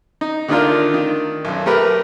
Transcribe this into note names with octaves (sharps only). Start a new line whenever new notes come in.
D#4
D3 D#3 A3 D4 F4 A#4
D#3
B1 F#2
A3 G4 A#4 B4